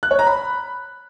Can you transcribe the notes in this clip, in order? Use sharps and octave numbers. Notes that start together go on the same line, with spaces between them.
F#6
C#5
A#5
B5